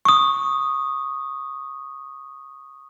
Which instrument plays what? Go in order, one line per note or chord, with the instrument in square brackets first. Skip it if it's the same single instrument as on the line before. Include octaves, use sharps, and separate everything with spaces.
[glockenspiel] C#6 D#6